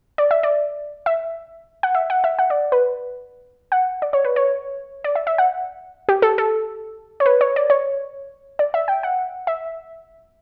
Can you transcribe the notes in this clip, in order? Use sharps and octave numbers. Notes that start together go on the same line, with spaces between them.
D5
E5
D5
E5
F#5
E5
F#5
E5
F#5
D5
B4
F#5
D5
C#5
B4
C#5
D5
E5
E5
F#5
G4
A4
A4
C#5
B4
C#5
D5
C#5
D5
E5
G5
F#5
E5